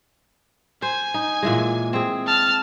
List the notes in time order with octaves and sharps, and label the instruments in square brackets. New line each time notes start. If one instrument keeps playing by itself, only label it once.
[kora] C5 [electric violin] G#5
[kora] D#4
A#2 E3 G#3
C4 G#4
[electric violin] A5 F6